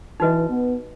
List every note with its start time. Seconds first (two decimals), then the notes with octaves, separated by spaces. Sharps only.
0.20 E3 D#4 F#4 B4 D#5
0.49 B3